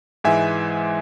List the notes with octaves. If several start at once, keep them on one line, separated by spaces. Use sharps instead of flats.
G#2 E3 G#3 E5 G#5